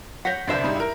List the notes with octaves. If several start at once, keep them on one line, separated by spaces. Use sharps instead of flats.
C#5 F#5 G6 A#6 B6
G1 C2 D4 C5 E5
G#2 G3 D#4
E4 A#4